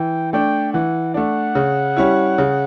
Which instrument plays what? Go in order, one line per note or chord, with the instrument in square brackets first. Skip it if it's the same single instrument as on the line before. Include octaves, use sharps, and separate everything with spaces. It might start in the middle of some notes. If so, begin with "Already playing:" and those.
Already playing: [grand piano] E3 [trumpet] G5
[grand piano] A3 D4 [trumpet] G5
[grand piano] E3 [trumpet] F#5
[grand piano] A3 D4 [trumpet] F#5
[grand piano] C#3
G3 C#4 E4
C#3